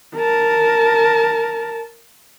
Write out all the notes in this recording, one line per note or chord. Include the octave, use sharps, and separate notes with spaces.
A#4 A5